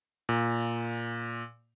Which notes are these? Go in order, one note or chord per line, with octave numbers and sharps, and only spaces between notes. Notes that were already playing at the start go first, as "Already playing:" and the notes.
A#2